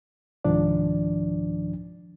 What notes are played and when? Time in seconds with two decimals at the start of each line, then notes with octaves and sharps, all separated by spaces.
0.44 C2 G#2 D#3 F3 D4 D5